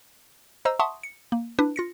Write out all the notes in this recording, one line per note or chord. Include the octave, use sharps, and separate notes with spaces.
C5 D#5 A#5 E6
E5 F#5 A5 C6 C#6 D#6
C#7
A#3
D4 E4 B4
F4 A#6 C#7